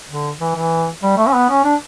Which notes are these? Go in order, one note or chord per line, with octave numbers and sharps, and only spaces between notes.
D3
E3
E3
G3
A3
C#4
B3
C#4
D4